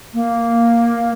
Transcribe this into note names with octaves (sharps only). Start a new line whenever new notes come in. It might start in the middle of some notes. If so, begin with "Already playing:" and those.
A#3